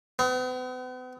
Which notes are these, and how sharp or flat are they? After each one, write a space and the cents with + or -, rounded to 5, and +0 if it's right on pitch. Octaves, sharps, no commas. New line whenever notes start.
B3 +45